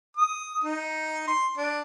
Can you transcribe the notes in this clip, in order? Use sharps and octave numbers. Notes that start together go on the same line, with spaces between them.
D#6
D#4
C6
D4